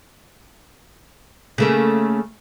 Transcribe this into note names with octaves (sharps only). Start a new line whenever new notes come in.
C#3 A3 A#3